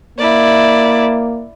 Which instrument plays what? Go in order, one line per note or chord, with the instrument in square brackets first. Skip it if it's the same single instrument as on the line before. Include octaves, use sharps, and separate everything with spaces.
[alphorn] A#3 [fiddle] E4 D5